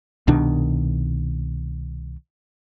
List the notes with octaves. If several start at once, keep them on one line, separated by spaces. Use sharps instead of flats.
C2 B2 D#3 D4